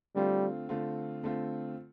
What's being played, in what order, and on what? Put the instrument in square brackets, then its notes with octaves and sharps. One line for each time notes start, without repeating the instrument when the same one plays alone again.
[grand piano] D3 A3 C4 F4 [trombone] G3
[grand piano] D3 A3 C4 F4
D3 A3 C4 F4